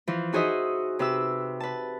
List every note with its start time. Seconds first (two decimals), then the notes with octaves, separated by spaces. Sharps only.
0.07 E3 F3
0.33 D#4 F#4 G#4 C5 D#5 E5
0.99 C3 B4 E5 E6
1.60 B4 A5